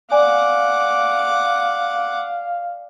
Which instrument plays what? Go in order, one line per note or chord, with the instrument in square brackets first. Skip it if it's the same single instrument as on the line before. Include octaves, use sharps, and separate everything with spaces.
[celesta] D5 G#5 [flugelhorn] F5 [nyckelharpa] F#5 D6